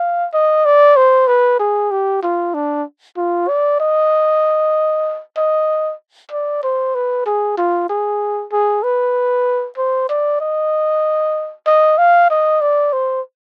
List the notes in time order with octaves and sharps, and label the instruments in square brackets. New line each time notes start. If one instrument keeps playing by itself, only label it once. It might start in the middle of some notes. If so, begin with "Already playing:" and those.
Already playing: [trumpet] F5
D#5
D5
C5
B4
G#4
G4
F4
D4
F4
D5
D#5
D#5
D5
C5
B4
G#4
F4
G#4
G#4
B4
C5
D5
D#5
D#5
F5
D#5
D5
C5